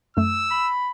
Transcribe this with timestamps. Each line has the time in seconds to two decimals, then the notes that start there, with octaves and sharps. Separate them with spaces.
0.17 F#2 A3 E6
0.51 B5